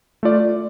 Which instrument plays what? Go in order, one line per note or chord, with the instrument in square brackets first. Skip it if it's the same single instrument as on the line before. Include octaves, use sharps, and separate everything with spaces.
[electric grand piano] A3 F4 D5